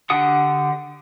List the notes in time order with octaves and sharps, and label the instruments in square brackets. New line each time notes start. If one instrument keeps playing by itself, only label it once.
[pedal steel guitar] D3 D4 G4 F#5 D#6